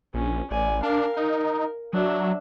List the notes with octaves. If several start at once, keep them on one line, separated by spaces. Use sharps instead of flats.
A#1 C#4
A1 D5 G#5
D4 A#4 F5
D#4 A#4
F#3 D4 E5